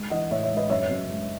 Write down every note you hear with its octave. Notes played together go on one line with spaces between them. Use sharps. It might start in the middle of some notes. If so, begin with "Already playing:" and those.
Already playing: G#3
E3 D#5 F#5
A2 C#5 E5
C#5 E5
G#3
B4 D#5
F#2 C#5 E5
F#2
G#3